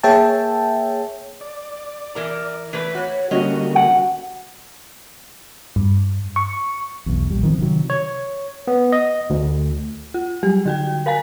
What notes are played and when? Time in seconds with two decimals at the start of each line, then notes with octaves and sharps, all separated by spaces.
0.03 A#3 G#4 C#5 E5 G5 A5
1.41 D5
2.15 E3 A#4 A#5
2.73 E3 A3 B4
2.94 F#4 C#5
3.31 D3 G3 A#3 C#4 F#4 D#5
3.75 F#5
5.76 G2
6.36 C#6
7.06 B1 E2
7.30 A#1 G3
7.43 D#3 F3 C4
7.58 C3 D#3 F#3
7.90 C#5
8.67 B3
8.92 D#5
9.30 D2
10.14 F4
10.43 F#3 G3 G4
10.66 D3 F#4 G5
11.06 A#4 F5 G#5 A#5 B6